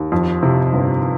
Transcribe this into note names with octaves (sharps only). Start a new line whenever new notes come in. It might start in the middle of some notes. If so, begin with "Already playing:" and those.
Already playing: D#2
F2
C3
G1